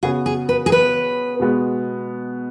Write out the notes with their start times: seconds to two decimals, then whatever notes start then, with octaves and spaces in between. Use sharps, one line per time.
0.03 C#3 B3 F#4 G#4
0.26 G#4
0.49 B4
0.66 G#4
0.72 B4
1.40 B2 G#3 B3 F#4